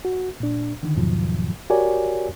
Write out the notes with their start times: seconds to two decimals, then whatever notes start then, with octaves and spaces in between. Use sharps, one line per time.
0.05 F#4
0.40 A#2 D4
0.83 D3 D#3
0.96 E2 G#2 B2 D#3 F3 F#3
1.70 F#4 G4 A#4 C#5 D5 G#5